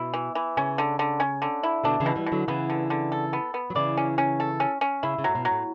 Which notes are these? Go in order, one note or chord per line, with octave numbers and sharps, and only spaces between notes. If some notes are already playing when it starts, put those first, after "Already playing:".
Already playing: B2 E4
E3
E3
C#3 C#4
D3
D3
C#4
D3
E4
B2 D3 D4
C#3 E3
B2
E3 G3
B2
D3 F#3
C#3 E3 B3
D3
D3
A4
B3
B3
F#3
C#3 E3 D5
C#4
C#4
A4
C#4
C#4
C#3 E4
C#3
A2 F#3
B2
F#3
A2